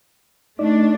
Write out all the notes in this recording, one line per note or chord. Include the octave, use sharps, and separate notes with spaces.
A3 D4 D#4 D5